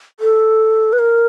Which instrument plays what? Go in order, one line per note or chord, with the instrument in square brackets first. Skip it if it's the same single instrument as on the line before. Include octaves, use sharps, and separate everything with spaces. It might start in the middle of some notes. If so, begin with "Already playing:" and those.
[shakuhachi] A4
B4
A#4